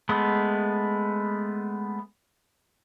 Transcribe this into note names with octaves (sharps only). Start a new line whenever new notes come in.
G#3 A3 B3